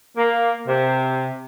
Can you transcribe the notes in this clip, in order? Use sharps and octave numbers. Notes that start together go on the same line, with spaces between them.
A#3
C3